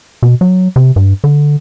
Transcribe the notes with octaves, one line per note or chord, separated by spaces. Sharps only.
B2
F#3
C3
G2
D3